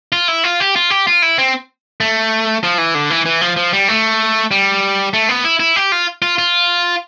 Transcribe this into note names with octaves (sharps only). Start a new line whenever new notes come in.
F4
E4
F4
G4
F4
G4
F4
E4
C4
A3
F3
E3
D3
E3
E3
F3
F3
G3
A3
G3
A3
B3
E4
E4
G4
F4
F4
F4